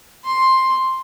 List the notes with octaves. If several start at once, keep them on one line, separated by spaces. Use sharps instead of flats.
C6